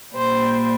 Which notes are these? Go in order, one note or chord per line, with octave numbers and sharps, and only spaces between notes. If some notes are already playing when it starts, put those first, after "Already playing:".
A#2 G3 C5